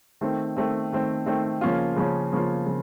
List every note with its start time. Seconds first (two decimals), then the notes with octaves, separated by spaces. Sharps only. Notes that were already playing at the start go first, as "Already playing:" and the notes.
0.21 D#3 A3 C4
0.57 D#3 A3 C4
0.92 D#3 A3 C4
1.26 D#3 A3 C4
1.61 C#3 F3 A#3 C#4 F4
1.96 C#3 F3 A#3 C#4 F4
2.32 C#3 F3 A#3 C#4 F4
2.66 C#3 F3